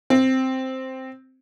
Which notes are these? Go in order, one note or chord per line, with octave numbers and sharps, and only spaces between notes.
C4